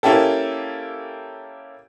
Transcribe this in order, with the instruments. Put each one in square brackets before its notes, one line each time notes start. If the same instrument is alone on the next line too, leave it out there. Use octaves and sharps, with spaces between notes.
[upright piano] A#3 C#4 E4 G4 A4